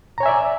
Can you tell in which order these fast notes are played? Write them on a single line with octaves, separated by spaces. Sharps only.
A#5 C#5 G#5 E5 D5